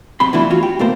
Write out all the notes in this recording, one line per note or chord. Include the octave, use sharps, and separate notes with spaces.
F#2 C3 B5 C6
E3 F#3 A3 D4 E4 F4
F4 F#4
G4
B1 A3 A#3 C5